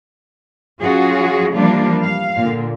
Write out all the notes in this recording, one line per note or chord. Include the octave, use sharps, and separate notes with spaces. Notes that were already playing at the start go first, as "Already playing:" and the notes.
F#3 C#4 F4 F#4 G#4
E3 F3 G3 A#3 D4 F4
F5
A#2 D3